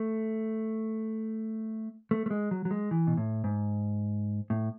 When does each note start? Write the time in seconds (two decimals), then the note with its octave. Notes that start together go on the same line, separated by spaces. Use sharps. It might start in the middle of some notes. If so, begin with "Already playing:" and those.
Already playing: A3
2.11 A3
2.26 A3
2.30 G#3
2.51 F#3
2.65 F#3
2.71 G#3
2.91 E3
3.07 B2
3.17 A2
3.44 G#2
4.50 A2